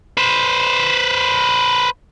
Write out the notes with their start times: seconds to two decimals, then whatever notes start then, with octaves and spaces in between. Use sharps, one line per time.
0.17 B4 C5